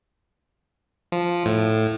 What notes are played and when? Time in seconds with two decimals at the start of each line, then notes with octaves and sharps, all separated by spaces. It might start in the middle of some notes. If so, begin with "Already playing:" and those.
1.12 F3
1.46 A2